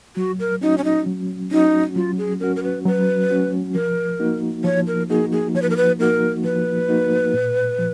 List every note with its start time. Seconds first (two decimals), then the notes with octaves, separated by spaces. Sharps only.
0.16 F#3 F#4
0.39 A#4
0.61 C#4 D#4 F#4
0.78 C#4
0.84 D#4
1.06 F#3
1.51 C#4 D#4 F#4
1.96 F#3 F4
2.18 G#4
2.40 C#4 F#4 A#4
2.56 A#4
2.63 B4
2.85 F#3 B4
3.30 C#4 F#4
3.75 F3 A#4
4.20 A#3 D#4 F#4
4.64 F3 C#5
4.87 A#4
5.10 A#3 D#4 F#4 G#4
5.32 G#4
5.55 F3 C#5
5.62 B4
5.70 A#4
5.77 B4
5.99 A#3 D#4 F#4 A#4
6.44 F3 B4
6.89 A#3 D#4 F#4
7.34 A#2
7.78 F3